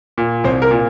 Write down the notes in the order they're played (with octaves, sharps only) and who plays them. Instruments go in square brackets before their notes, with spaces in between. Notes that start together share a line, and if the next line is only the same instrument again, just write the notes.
[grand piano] A#2
C2 C5
A#4
A#2